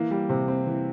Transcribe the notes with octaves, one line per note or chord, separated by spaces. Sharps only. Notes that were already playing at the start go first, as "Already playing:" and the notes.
Already playing: E3 A#3
G3
C3
C4
E3